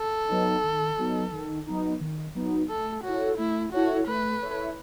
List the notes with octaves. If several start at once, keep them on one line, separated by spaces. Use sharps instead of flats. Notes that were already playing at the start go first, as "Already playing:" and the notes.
Already playing: A4
F#3 B3 D#4
D#3
F#3 B3 D#4
D#3
F#3 B3 D#4
D#3
F#3 B3 D#4
A3 A4
E4 F#4 A4 C#5
A3 E4
E4 F#4 A4 C#5
A3 B4
E4 A4 C#5